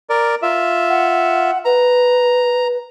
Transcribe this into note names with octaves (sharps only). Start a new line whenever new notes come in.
A#4 D5
F4 E5
F#5
B4 A#5